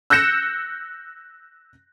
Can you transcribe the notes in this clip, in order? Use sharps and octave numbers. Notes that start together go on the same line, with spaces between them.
E6 F#6 G6 A#6 C#7 E7